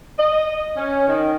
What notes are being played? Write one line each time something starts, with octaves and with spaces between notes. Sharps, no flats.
D#5
C#4
D#3